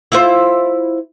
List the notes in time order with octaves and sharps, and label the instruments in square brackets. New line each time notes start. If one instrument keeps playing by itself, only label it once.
[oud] E4 F4 C5